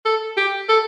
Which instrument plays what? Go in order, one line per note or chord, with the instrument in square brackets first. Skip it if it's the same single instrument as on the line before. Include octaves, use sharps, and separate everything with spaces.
[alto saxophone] A4
G4
A4